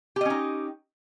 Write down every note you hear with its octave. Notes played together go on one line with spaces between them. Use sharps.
C#4 D#4 G4 D#5